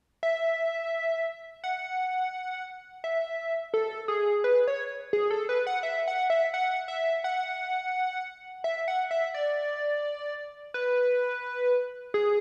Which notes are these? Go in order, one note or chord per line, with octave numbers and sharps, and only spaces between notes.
E5
F#5
E5
A4
G#4
B4
C#5
G#4
A4
B4
F#5
E5
F#5
E5
F#5
E5
F#5
E5
F#5
E5
D5
B4
G#4